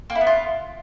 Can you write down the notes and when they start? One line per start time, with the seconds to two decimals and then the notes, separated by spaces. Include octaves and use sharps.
0.10 A#3
0.15 E4
0.21 B3
0.27 F4